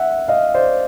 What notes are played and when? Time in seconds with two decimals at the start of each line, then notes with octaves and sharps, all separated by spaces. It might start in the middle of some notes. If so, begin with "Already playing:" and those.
Already playing: E5 F#5
0.28 D#5 F5
0.54 C5 D5